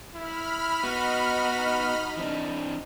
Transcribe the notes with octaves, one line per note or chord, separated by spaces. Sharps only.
E4 B5 F6
B3 D#4 F#4 D#5
E3 C4 D4